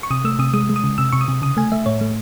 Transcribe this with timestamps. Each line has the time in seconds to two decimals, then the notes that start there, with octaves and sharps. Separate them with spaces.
0.03 C#6
0.11 C3 D#6
0.24 A3 E6
0.39 C3 D#6
0.54 G#3 D#6
0.69 G#3
0.76 D#6
0.84 C#3
0.98 C3 E6
1.12 C3 C#6
1.21 D#6
1.28 C3
1.42 C#3 D#6
1.57 A3 G#5
1.72 A3 E5
1.86 A2 C#5
2.01 A3